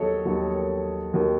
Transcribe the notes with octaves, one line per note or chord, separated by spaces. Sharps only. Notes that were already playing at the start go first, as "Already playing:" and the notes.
Already playing: D#2 D#3 F#3 G#4 A4 C#5 D#5
D#2 D#3 F#3
D#2 D#3 F#3